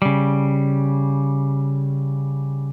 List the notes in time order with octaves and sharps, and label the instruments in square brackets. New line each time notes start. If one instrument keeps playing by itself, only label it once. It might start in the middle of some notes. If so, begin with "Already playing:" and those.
[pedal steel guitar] C#3 G3